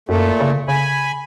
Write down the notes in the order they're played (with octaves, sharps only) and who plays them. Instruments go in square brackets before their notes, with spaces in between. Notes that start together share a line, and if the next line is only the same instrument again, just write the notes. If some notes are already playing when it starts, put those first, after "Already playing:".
[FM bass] F#2 [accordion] A#2 A3
[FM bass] C#3
[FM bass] C#3 [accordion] G#5 B5